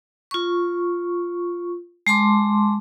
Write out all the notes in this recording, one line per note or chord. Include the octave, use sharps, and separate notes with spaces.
F4 C#6
G#3 A5 C6 D6